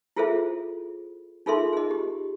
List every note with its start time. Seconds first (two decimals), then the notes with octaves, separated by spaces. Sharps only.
0.16 E4 F4 G#4 A4 C5 E5
1.46 D#4 F4 G#4 A4 E5 C6
1.73 G#4 D#5
1.91 G4